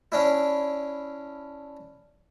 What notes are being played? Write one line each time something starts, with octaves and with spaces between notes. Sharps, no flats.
C#4 D4 E4